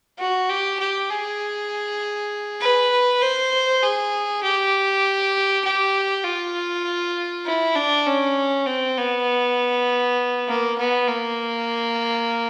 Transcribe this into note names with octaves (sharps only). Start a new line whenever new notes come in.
F#4
G4
G4
G#4
B4
C5
G#4
G4
G4
F4
E4
D4
C#4
C4
B3
A#3
B3
A#3